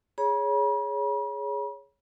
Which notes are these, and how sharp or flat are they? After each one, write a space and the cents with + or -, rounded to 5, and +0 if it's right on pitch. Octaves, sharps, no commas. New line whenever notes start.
G#4 +0 C#5 +5 B5 -45